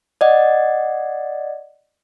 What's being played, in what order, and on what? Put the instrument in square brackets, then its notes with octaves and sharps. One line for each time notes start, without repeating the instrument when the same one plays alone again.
[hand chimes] D5 D#5 F#5